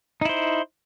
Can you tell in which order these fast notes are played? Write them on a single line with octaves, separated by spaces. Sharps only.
D#4 E4 C5